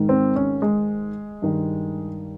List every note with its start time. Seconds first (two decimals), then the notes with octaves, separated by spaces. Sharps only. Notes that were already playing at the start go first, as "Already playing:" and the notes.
Already playing: G#2 D#3
0.09 C4
0.36 C#4
0.62 G#3
1.42 G2 D#3